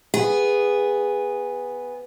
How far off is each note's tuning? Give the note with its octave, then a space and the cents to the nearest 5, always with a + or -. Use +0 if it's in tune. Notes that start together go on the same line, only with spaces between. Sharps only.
B3 +0 G#4 -15